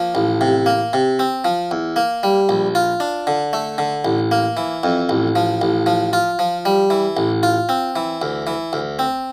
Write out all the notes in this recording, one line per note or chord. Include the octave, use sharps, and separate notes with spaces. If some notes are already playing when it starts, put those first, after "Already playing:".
Already playing: F3 A#3
A1
C3
A#3
C3
C4
F3
E2
A#3
G3
A#1
F4
D4
D3
A3
D3
A1
A#3
E3
F2
A1
F3
A1
F3
F4
F3
G3
E3
A1
F4
C4
E3
D2
E3
D2
C4